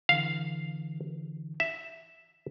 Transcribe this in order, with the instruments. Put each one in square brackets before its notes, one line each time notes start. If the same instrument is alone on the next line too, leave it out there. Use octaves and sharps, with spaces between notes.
[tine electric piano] D3 E3 [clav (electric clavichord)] F5
[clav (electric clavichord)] E5